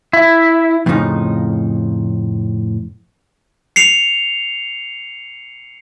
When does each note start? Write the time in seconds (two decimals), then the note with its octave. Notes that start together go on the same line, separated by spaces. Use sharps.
0.13 E4
0.86 F2 A2 C#3 F3 D#4
3.76 C7 C#7 F7